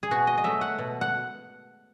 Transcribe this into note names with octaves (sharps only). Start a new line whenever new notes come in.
G#4
B2 F#4
D#5
D#5
F#3 A3 E5
F#5
B2
F#5